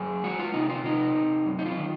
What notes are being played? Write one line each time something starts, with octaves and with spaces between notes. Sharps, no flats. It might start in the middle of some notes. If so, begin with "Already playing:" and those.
Already playing: F#2 G#4
G#3 F#4
F4
C3 D#4
F4
C3 D#4
C3
F#2
D#4
F4
D#3